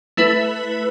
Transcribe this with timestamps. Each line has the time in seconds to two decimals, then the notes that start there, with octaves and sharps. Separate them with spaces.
0.17 A3 E4 B4